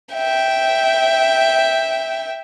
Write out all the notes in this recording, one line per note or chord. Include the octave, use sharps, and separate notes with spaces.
E5 G5